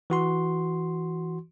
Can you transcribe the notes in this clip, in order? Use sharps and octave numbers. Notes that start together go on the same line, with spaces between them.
E3 F#4 C6